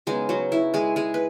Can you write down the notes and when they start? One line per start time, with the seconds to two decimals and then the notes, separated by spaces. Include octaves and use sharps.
0.07 C#3 F#3 G#3 B3 D#4 G#4
0.29 F#3 F#4
0.52 E4
0.74 G#3 G#4
0.96 G#3 G#4
1.14 B4